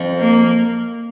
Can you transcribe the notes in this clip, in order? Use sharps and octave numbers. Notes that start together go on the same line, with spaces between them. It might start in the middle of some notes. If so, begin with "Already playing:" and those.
Already playing: F2
A#3